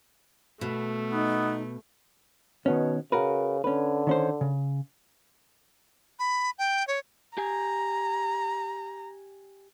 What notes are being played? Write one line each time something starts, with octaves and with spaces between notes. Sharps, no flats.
B2 A3
B3 D#4
B2 D#3 B3 C#4
C#3 F#4 A#4 B4
D3 C#4 B4
D#3 C#4 C5
C#3
B5
G5
C#5
G4 G#5 A#5